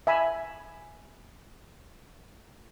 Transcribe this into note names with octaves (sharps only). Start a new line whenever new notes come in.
E5 G#5 B5